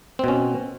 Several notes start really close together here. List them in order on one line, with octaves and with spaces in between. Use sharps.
C4 B2 C#4